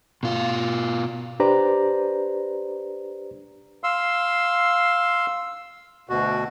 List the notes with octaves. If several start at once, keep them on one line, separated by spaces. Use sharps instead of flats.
B2 F4
D4 G4 B4 C5 D5 A#5
F5 C6 E6
D2 B2 F#4